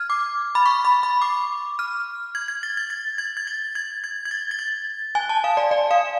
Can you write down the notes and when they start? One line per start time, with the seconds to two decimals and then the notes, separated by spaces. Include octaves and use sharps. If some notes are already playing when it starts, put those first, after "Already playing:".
Already playing: F6 G#6
0.10 D6
0.55 B5
0.66 C#6
0.85 B5
1.03 B5
1.22 D6
1.79 F6
2.35 G#6
2.48 G#6
2.63 A6
2.77 G#6
2.90 A6
3.18 G#6
3.37 G#6
3.47 A6
3.75 G#6
4.04 G#6
4.25 G#6
4.31 A6
4.51 A6
4.59 G#6
5.15 G#5
5.29 A5
5.44 F5
5.57 D5
5.71 D5
5.91 F5